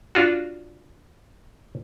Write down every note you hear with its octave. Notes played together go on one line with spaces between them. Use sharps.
D4 F4 F#4